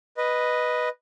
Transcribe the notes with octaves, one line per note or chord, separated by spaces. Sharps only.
B4 D#5